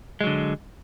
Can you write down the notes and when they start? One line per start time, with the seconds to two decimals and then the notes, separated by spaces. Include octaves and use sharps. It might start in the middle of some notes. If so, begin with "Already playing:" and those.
0.21 G#3
0.24 F#3
0.27 D3